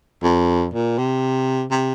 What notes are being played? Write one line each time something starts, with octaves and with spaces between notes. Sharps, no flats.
F2
A#2
C3
C3